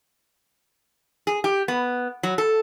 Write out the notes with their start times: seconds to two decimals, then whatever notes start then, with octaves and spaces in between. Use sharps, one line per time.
1.27 G#4
1.44 G4
1.68 B3
2.23 F#3
2.38 A4